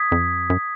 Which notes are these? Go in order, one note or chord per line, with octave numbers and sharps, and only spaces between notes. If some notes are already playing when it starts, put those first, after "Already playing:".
Already playing: D#6 G#6 B6
F2
F#2